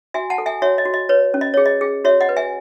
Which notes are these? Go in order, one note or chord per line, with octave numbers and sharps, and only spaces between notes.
F#4 E5 G#5
F#5 A5
A4
E5 G#5
F#4 C#5 E5
D#5
F#4
D#5
B4 C#5
C#4
D#5
G#4 C#5
D#5
G#4
F#4 C#5 E5
D#5 F#5
B4
E5 G#5